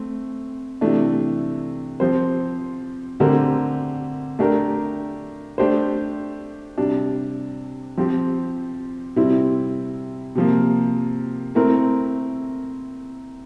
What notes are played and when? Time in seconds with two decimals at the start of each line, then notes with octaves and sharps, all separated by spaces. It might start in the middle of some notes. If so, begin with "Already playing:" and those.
Already playing: A3 C4
0.81 C3 E3 A3 D4
2.00 F3 C4 G4 C5
3.20 D3 A3 C4 G4 A#4
4.39 A3 D4 G4 A#4
5.58 A3 D4 G4 C5
6.78 C3 G3 D4
7.97 F3 C4 G4
9.16 C3 G3 C4 E4
10.35 C3 F3 A#3
11.55 A3 C4 E4 A#4